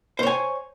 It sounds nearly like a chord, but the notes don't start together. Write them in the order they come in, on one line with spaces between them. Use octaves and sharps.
C5 C#5 G#5